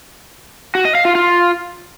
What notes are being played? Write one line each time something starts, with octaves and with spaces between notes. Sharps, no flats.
F#4
D#5
F5
F4
F4